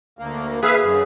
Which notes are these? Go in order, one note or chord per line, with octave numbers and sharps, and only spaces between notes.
D2 A#3
G#4 B4 E5 F5
F#2